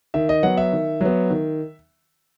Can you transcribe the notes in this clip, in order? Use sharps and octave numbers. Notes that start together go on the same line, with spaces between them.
D#3 E5
D#5
F#3 B3 F#5
E5
D#3
F#3 B3
D#3